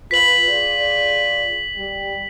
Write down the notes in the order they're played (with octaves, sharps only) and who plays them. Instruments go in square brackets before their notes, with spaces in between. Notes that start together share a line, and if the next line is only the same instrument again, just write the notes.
[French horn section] F4 B4 [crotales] B6 F#7
[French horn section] F4 G#4 D5
G3